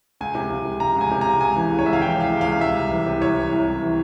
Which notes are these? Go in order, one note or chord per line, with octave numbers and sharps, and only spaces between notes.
C#2 G#5
C3
C#2
C3
C#2 A#5
C#2 G#5
C3
C#2 A#5
C#2 G#5
E3
C#2
C#5
C#2 E5
F5
E3 G5
C3 F5
C#2
F5
C#2
C3 E5
C2
E3
C3
C2 C#5
E3
C2
C3
E3